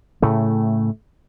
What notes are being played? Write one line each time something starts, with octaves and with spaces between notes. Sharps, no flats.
A2 C#3 A3